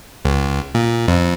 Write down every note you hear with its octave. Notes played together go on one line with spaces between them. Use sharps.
C#2
A#2
F2